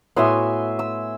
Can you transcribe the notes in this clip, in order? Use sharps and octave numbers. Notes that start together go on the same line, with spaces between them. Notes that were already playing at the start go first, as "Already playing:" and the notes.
A2 B3 F#4 E5 G#5 C6
E6